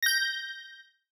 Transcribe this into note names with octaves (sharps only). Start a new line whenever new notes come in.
G6 A#6